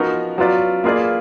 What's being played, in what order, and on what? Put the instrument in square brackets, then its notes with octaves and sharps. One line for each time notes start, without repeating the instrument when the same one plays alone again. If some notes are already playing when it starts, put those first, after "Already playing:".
Already playing: [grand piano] F3 B3 D#4 F#4 A#4
F#3 B3 F4 B4 D5
A#3 F4 G#4 B4 D5